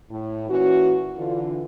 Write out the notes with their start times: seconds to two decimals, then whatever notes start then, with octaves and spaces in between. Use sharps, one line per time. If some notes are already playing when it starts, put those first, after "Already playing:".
0.10 A2
0.49 A#2 E3 C#4 F#4
1.17 D3 E3 F4